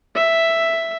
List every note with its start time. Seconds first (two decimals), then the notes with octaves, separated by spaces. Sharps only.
0.15 E5